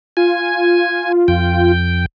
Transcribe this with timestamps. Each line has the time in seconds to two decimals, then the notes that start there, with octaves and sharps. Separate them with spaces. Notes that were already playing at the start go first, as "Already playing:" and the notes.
0.17 F4 G#5
1.28 F2 G5